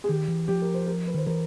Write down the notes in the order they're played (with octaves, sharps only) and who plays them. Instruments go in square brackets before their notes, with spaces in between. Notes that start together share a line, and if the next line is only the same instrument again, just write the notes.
[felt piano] G#4
[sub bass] D#3 [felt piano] G4
[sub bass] E3
[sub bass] F3 [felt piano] G4
[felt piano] A#4
C5
A#4
B4
[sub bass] D#3 [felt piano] C5
[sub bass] E3 [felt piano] A#4